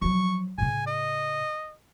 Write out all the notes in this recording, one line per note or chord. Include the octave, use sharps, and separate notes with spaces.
F3 F#3 C#6
A2 C#3 G#5
D#5